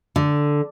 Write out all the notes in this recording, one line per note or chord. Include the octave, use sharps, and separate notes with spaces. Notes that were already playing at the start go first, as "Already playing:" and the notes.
D3